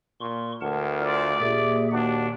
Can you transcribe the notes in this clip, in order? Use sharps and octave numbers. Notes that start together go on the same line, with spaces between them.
A#2 C6 C#6
D2 A#4 F#5 A5
F4 D5
A#2 G4 G#4 E5
D#2 D4 F#4 G4 F#5